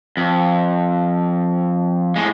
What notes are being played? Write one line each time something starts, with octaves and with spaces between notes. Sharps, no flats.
F2
A2 G#3